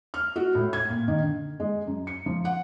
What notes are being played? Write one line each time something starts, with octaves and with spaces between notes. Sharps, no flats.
F6
F#4
A2
G#6
A#2
D#3
D3
G#3
F#2
C#7
F3
F#5